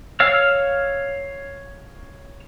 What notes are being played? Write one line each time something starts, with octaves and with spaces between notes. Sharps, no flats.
C#5 F5 E6 F6